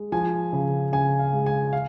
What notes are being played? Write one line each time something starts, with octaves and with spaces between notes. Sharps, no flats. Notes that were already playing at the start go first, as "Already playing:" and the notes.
Already playing: G#3
F3 G#5
C#3
C#3 G#5
F5
G#3
G#5
F5